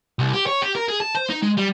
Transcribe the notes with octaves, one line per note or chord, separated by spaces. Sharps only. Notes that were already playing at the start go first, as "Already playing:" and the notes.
C2
G4
C#5
G4
A#4
G#4
A5
C5
D#4
G#3
G3